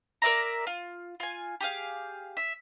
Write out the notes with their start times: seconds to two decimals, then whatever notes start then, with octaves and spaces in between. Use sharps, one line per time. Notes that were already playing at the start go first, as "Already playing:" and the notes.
0.22 A#4 D5 E5 A#5
0.67 F4
1.20 F4 G#5
1.61 G4 G#4 F5
2.37 E5